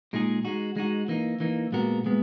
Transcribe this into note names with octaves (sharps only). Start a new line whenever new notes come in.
A#2 G#3 D#4 G#4
G#3 D#4 F#4
G#3 D#4 F#4
E3 A#3 D#4
E3 A#3 D#4
A#2 G#3 B3 F#4 A#4
A#2 G#3 B3